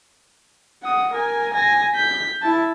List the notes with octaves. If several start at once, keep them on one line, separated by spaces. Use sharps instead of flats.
F#5 D#6
A#4 G#5
G#5 A#6
G6 B6
E4 A5